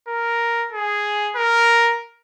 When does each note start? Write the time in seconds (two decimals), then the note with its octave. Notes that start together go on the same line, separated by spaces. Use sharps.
0.08 A#4
0.73 G#4
1.36 A#4